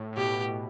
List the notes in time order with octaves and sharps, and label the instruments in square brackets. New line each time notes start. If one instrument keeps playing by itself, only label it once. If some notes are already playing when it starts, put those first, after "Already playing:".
Already playing: [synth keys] A2
A2
[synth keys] B2 [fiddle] G4